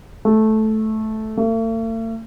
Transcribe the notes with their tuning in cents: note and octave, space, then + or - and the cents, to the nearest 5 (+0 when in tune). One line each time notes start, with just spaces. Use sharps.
A3 -10
A3 +45